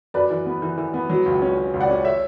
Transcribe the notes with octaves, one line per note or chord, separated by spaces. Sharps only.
F#2 B4 D5
E3
B3
E3
E3
B3
F#3
C#2
C#4
C#4
C#2
D5 F#5
C#4
C#5 E5